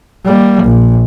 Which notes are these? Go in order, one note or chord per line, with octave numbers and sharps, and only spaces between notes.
G3 A#3
A#1